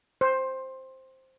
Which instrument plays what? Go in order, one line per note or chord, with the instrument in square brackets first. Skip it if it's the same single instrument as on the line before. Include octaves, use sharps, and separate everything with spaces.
[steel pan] C5